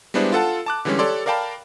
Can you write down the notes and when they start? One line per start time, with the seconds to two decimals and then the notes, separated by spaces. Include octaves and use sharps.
0.14 G3 G#3 B3 D4 E4 C5
0.32 F4 A4 F#5 A5
0.66 A5 D6 F#6
0.85 D3 E3 G3 G#3 C#4
0.99 G4 A4 C#5 D5 C6
1.26 A#4 D5 F5 G5 A5 B5